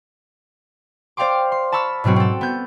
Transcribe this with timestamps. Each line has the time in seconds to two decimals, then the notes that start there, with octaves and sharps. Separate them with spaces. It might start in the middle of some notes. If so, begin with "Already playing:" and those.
1.17 C5 D5 F5 G5 C6 D6
1.52 C6
1.72 A5 B5 C#6 E6 F6
2.04 G#2 B2 F#3 C4 F#4
2.16 C4 A4
2.41 B3 G6